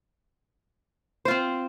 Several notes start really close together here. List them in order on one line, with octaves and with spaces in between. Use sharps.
C5 F4 C4